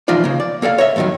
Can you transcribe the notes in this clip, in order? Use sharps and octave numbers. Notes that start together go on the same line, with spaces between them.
E3 F3 D#4 F4 D5
C#3 A#3
D5
A#3 A4 D5 F5
C#5 D#5 E5
E2 G2 B2 D#3 F#3